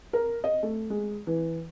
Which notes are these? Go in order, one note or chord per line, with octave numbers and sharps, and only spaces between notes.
A#4
D#5
A3
G#3
E3